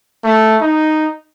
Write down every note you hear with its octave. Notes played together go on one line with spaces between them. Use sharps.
A3
D#4